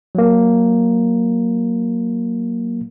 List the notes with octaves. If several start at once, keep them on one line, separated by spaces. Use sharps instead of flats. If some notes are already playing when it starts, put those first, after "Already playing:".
F#3 A#3